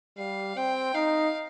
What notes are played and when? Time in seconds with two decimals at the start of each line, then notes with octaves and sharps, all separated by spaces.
0.18 G3 F5
0.56 C4 G5
0.94 D#4 F5